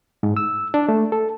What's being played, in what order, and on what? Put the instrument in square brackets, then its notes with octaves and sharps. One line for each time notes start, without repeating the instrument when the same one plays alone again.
[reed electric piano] G#2
E6
D4
A3
A4